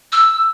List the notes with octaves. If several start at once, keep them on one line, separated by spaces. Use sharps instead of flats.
E6